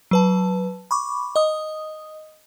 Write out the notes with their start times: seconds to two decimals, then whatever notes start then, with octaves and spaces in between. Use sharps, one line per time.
0.11 F#3 B4 A5
0.91 B5 C#6 D6
1.36 D#5 D#6